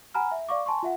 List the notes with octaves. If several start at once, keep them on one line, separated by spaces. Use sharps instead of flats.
F#5 G#5 A#5 B5 F6
E5
D5 F5 C#6 D6
G#5 A5 C6 C#6
F4 E5 F#5